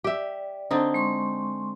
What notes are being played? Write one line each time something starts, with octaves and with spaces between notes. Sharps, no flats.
G4 D5 E5
D3 C4 D#4
G#3 C6 C#6